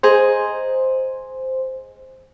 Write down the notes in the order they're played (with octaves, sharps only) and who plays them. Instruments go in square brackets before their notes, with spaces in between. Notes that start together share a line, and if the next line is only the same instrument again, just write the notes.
[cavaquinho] G#4 D#5 A#5 [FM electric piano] C5